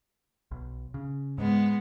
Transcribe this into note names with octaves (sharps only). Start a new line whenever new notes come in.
B1
C#3
G#2 G#3 B3